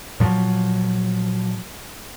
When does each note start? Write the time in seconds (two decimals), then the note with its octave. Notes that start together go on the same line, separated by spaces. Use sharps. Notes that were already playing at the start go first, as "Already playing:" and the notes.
0.20 A#2 F3 F#3